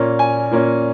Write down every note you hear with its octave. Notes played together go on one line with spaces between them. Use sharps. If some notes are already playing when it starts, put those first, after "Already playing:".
Already playing: A#2 A#3 C#4
G#5
A#2 A#3 C#4